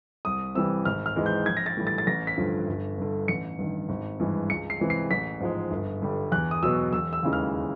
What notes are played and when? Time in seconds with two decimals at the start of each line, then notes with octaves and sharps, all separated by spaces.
0.25 C2 D#6
0.55 C3 E3 G3 E6
0.85 G#1 F6
1.06 F6
1.16 G#2 E3 G#3
1.26 G6
1.46 A#1 G#6
1.57 A#6
1.66 A6
1.77 A2 E3 G3
1.87 A6
1.98 A6
2.07 A1 A#6
2.27 B6
2.37 G2 D3 F3
2.68 G1
2.98 G2 D3
3.28 A1 C#7
3.59 G2 D#3
3.89 G#1
4.20 G2 E3 G#3
4.50 C#2 C#7
4.70 C7
4.80 C3 E3 G#3
4.90 C7
5.11 A1 B6
5.40 G#2 F3 G#3
5.71 G1
6.02 G2 D3 G3
6.32 E2 F#6
6.51 D#6
6.63 B2 F#3 E6
6.92 E1 E6
7.13 E6
7.23 D#2 C#3 E3 G#3
7.33 F6